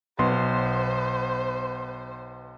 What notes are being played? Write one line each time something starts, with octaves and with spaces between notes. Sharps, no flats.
B1 B3 C5 C6